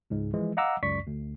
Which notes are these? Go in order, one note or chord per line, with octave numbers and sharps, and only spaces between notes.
C#2 G#2 G#3
E3 F3 G#3
D#5 F5 F#5 A#5 D6 E6
C#2 F#2 D5 C#6 B6
D2